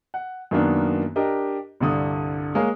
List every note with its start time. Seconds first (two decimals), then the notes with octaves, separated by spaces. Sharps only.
0.14 F#5
0.51 F#2 D#3 A#3 B3 D4
1.16 D4 G4 A#4 D#5
1.80 C2 G2 D3 D#6
2.55 G#3 A#3 G#4 C#5 F5